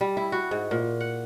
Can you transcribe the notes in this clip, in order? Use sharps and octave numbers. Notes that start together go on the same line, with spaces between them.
G3
E4
F#4
G#2
A#2
F#5